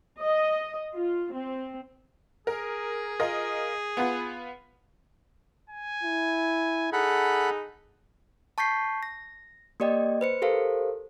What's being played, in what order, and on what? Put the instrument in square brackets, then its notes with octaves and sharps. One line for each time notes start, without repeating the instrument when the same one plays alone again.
[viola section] D#5
F4
C4
[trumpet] G#4 [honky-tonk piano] A#4
[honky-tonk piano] F4 A#4 D#5
B3 F4 B4
[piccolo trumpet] G#5
[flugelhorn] E4
[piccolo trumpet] D#4 [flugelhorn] G#4 [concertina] A4 F#5 B5
[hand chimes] A5 C#6 G6 B6 C7
A#6
A#3 G4 D5 D#5 G5
B4 C5 C#7
G4 A4 A#4 C5 F5